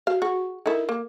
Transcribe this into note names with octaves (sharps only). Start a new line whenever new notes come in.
F#4 F5
F#4 G#4
D#4 E4 A4 A#4
A#3